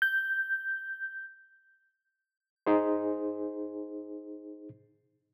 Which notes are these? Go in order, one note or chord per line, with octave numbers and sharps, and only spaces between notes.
G6
D#4 G#4 C5